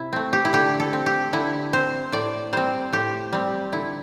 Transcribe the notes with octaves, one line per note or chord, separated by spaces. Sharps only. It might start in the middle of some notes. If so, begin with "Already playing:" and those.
Already playing: C3 E4
A3 C4
G4
E4
D3 G4
A4
C4
G4
D3 E4
C4 C5
A2 D5
G3 C4 C5
A2 G4
G3 C4
D3 E4